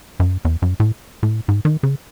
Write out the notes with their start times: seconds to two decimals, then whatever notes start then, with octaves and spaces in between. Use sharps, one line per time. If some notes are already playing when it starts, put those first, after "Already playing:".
0.20 F#2
0.45 E2
0.62 F#2
0.80 A2
1.23 A2
1.48 G#2
1.65 D#3
1.83 C#3